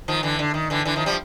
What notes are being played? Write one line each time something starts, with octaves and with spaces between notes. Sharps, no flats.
D#3 F3
D3 E3
D3
D#3
D3 E3
D3 E3
D#3 F3
F3 G3